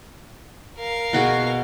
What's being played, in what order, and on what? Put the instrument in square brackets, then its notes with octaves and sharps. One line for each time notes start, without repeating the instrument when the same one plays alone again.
[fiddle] A#4 F5
[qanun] B2 F#4 G#4